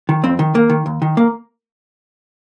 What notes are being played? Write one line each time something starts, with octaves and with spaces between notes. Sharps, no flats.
D#3
F2 C4
D#3
D#2 A#3
D#3
D#2
D#3
A#3